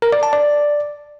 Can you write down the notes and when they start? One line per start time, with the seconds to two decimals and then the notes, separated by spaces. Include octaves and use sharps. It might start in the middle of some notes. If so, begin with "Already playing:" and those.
0.02 A#4
0.13 D5
0.23 A5
0.33 D5